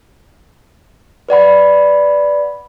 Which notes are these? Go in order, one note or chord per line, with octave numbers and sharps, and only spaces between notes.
B4 D5 F#5 B5